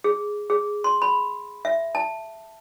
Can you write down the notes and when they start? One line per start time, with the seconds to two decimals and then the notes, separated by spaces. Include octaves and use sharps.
0.04 G#4
0.50 G#4
0.84 C6
1.02 B5
1.65 E5
1.95 A5